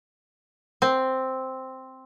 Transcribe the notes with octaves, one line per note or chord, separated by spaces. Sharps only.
C4